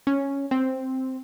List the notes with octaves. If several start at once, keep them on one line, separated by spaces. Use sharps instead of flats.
C#4
C4